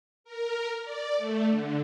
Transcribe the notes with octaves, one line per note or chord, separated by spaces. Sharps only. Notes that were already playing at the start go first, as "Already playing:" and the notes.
A#4
D5
A3
D3